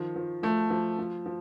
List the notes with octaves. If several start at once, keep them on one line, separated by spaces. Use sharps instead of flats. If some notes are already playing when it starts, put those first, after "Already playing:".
Already playing: D#3 F3
F3
F3 A3
F3
F3
F3